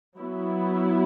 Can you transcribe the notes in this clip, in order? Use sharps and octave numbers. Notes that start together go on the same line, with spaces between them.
F#3 B3 E4